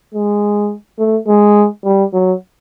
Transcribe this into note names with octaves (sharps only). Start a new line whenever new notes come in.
G#3
A3
G#3
G3
F#3